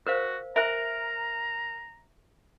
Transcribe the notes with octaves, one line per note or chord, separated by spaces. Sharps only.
F#4 A#4 C5 F5
A#4 E5 G#5 A#5 F#6